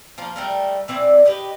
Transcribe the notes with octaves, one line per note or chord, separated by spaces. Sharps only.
F3 A#3 F4
G3 A3 A#4
E3 C4 D5 G#5
G4 B4 D#5